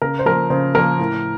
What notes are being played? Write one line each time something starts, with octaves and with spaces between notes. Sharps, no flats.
C#3 A#4
C5
F3 A#3 A#4
C#3 C5
F3 A#3 A#4
A2